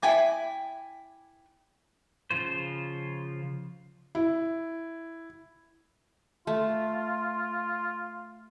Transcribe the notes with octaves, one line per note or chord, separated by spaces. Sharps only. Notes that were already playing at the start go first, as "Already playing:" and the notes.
E4 G5 G#5 D6
C#3 F3 F4 C5
E4
A3 F4